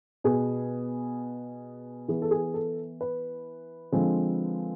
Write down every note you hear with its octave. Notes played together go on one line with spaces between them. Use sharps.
B2 B3 G#4
E3 B3 G#4
A4
G#4
A4
B4
D3 F3 G#3 C4